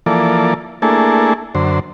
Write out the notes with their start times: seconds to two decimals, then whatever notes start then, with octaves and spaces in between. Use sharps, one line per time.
0.06 E3 F3 A#3 A4 D5
0.82 A3 A#3 D4 E4 G#4 A4
1.55 F#2 D3 C5